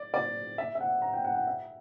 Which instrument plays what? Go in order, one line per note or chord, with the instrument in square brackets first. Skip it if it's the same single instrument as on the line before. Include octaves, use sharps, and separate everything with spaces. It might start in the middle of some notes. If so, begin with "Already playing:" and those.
Already playing: [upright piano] D5
D5
E5
E5
F#5
A#5
G5
F#5
F#5
E5